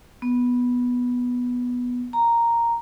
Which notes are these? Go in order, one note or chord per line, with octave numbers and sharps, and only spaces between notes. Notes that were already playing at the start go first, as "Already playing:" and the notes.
B3
A#5